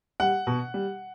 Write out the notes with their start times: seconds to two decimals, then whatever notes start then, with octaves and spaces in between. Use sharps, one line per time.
0.20 G3 F#5
0.47 B2
0.74 G3